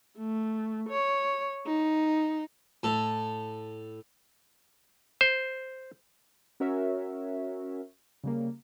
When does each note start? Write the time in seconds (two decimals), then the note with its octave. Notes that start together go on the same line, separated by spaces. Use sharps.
0.18 A3
0.89 C#5
1.66 D#4
2.83 A2 A4
5.21 C5
6.60 C#4 F#4 A#4 C#5 E5
8.24 C#3 G3 A#3